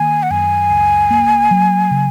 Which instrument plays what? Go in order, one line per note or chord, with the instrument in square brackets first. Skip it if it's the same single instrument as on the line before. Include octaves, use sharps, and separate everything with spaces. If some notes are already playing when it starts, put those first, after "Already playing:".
Already playing: [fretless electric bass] D#3 A#3 [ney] G#5
[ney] F#5
[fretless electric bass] F#2 [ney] G#5
[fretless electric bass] C#2
A#3
F#3
C#3